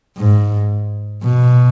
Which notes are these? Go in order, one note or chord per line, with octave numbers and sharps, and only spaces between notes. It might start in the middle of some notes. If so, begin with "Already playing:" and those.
G#2
B2